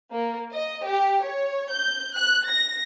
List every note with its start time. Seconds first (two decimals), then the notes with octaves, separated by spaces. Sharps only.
0.13 A#3
0.52 D#5
0.85 G4
1.25 C#5
1.71 G6
2.14 F#6
2.48 A#6